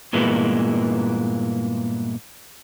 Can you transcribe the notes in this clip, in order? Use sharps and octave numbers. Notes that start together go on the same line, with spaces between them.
G2 A#2 E3 G#3 A#3 B3